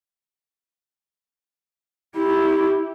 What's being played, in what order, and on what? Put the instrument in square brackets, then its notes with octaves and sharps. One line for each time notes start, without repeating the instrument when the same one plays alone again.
[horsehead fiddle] E4 G4